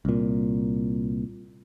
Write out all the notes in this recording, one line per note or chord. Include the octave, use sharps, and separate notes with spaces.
C2 A#2